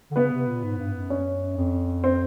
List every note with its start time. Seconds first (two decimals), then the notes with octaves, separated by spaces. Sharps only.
0.11 D3
0.16 C#3 B3 B4
0.32 C3
0.47 A#2
0.63 G#2
0.78 G2
0.94 F#2
1.10 C#4 C#5
1.57 F2
2.04 C4 C5